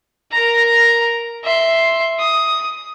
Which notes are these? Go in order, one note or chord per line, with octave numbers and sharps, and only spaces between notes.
A#4 A#5
E5 C6
D#6